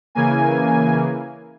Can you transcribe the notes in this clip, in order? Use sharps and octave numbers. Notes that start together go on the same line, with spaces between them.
C#3 E3 A#3 G#5